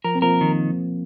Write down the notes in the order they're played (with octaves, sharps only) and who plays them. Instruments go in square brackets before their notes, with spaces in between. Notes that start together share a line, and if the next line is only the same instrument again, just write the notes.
[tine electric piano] F3 [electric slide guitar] A#4
[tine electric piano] C4
[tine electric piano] F3 A#3 [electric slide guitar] A#4
[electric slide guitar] D#3